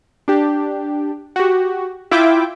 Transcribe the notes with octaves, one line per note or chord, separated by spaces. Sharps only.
D4 G4
F#4 G4
E4 F4 E5 G5 D6